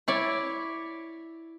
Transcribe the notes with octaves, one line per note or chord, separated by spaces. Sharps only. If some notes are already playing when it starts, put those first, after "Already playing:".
E4 C#5 D5